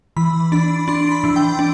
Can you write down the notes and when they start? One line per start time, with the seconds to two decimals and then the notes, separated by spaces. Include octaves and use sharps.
0.17 E3 B5
0.52 D4 B5
0.88 D4 C6
1.12 B5
1.24 E3
1.36 G5
1.59 D4